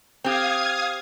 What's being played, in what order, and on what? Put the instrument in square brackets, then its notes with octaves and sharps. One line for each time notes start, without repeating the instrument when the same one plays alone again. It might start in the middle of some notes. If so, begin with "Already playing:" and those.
[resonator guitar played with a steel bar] C4 G4 [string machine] F5 D#6 G#6